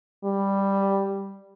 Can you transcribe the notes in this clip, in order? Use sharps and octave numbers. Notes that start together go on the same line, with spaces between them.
G3